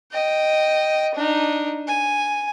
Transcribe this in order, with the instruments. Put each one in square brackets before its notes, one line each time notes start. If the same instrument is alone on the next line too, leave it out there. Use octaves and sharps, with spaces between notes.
[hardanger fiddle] D#5 G5
D4 D#4
G#5